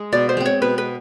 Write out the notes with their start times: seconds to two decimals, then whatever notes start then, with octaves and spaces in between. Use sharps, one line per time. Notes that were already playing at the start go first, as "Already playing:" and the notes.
Already playing: G#3
0.12 B2 D5
0.29 C5
0.37 G#3 C4
0.46 C#5
0.62 B2 B4
0.78 B4